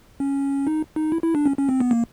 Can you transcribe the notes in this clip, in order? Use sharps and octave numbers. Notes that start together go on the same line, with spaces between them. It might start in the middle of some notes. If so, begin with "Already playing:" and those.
C#4
D#4
D#4
E4
E4
D4
C#4
C#4
C4
B3
A#3